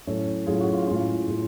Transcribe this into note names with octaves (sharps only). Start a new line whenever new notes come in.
A2 F#3 C#4 A4 C#5
A2 F#3 C#4 F4 G#4
F#4
F4
A2 G#3 C#4 F4
A2 G#3 C#4